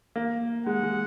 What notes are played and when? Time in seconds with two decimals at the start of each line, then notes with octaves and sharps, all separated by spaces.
0.16 A#3
0.66 G#3 F#5
0.83 G#3